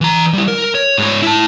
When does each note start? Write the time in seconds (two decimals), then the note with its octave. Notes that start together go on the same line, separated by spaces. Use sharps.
0.01 E3 A#5
0.33 G3 E4
0.48 A#4
0.75 C#5
0.98 G#2 C#5
1.22 E4 A5